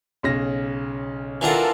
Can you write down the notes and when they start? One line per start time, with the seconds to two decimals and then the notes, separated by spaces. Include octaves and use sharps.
0.23 B1 C#3 A#6
1.41 E3 D4 F4 A4 A#4 F#5